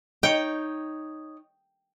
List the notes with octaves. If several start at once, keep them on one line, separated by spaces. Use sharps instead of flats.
D#4 C#5 G5